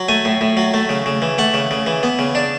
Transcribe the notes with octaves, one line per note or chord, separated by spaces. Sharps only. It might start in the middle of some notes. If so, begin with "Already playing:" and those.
Already playing: F#3
A3 G#5
A2
A2
F#3
A3
C#3
C#3
E3
A3 F#5
C#3
C#3
E3
B3
C#3
D4